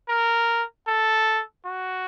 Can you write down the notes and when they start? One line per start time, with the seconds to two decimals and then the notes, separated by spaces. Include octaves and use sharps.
0.09 A#4
0.88 A4
1.66 F#4